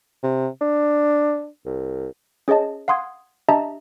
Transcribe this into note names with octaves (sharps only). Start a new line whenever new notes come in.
C3
D4
C2
C#4 G#4 C#5 D#5 A5
F5 F#5 C6 D#6 G#6
D4 G4 D#5 E5 A5 A#5